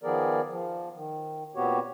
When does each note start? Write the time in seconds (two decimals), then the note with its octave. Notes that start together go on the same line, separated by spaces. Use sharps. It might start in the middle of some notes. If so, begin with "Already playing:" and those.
0.03 D#3 F3 B3 G#4 A#4 D5
0.49 F3
0.95 D#3
1.55 A#2 B3 C4 F#4 G4 C#5